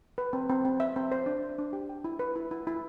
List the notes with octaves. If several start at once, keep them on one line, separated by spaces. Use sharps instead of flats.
B4
C4
C4
C4
E5
C4
C5
D4
C5
D4
G4
G5
E4
B4
E4
E4
E4